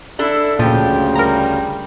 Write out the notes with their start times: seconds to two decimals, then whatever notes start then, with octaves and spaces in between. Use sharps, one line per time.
0.19 D4 E4 A4
0.59 D2 A#2 C#3 F3 G4
1.16 G3 A#4 A#5